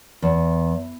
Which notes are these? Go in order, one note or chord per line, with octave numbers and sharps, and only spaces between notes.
E2